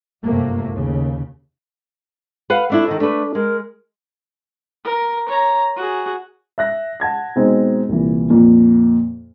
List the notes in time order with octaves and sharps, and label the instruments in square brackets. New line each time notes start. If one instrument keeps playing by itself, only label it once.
[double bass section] G1 F#2 C3 A3 A#3
D#2 C#3
[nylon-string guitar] B4 F5 F#5
[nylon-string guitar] A3 D4 E4 [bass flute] A4
[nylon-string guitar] D#3 D#5
[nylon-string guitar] A3 B4 [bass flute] D4
[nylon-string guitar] G#3 [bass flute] A#4
[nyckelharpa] A#4
C#5 A#5
F#4 G#4
[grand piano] E5 F#6 A#6
F#5 A5 G#6 A#6
B2 G#3 C4 D#4
C2 A#2 E3
F2 A#2 A#3